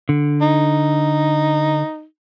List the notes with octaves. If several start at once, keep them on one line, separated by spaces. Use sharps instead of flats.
D3
D#4